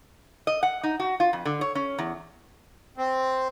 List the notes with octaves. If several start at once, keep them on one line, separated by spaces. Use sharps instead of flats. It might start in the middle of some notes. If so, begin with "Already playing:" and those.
D#5
F#5
D#4
F#4
F4
F2
D3
C#5
C#4
E2
C4